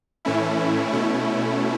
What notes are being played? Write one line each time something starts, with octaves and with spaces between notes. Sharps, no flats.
A2 E3 A3 C#4 E4
B2 A3 C#4 E4